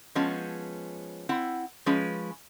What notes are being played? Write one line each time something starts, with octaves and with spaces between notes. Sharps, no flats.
F3 G#3 B3 C#4
C4 E4 F#5
F3 G#3 C#4 B4